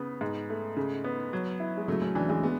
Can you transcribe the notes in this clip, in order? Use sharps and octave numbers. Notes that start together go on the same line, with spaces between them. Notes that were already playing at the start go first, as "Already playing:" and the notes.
Already playing: C#3 B3
G#2
A3
C#3
B3
F#3
E4
G#3
C#3 F#3 A3
A3 C#4
E3 D4
E3 G#3
G#3 B3